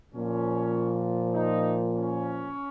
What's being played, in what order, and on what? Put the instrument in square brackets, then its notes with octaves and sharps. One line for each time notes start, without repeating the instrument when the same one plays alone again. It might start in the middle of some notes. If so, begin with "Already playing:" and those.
[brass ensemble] A#2 F3 C#4
D#4
C#4